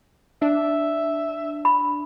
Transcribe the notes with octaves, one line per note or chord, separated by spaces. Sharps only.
D4 E5
B5